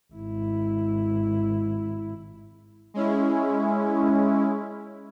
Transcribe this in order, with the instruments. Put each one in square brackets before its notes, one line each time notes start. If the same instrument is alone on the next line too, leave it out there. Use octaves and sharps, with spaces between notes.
[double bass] G#1 E4
[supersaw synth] G#3 C#4 E4